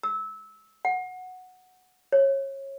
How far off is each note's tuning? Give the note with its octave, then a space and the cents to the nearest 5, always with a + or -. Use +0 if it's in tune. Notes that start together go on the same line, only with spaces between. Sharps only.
E6 -20
F#5 -5
C#5 -25